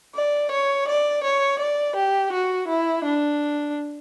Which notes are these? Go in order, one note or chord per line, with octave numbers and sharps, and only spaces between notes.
D5
C#5
D5
C#5
D5
G4
F#4
E4
D4